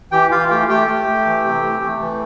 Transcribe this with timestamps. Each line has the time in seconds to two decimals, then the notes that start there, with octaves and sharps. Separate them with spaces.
0.12 E3 G4 G5
0.31 E3 F4 F5
0.50 A3 G4 G5
0.68 A3 G4 G5
0.87 A3
1.07 A3
1.26 E3
1.44 C3
1.63 A3
1.83 A3
2.01 E3